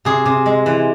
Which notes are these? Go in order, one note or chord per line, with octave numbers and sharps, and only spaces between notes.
C3 G#4
C3
G#3
E3